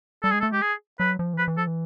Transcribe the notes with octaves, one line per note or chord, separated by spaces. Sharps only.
G3 A4
G#3 G#4
A3 A4
G#3 G4
G#4
F#3 B4
F3
E3
F3 B4
E3
F3 A4
E3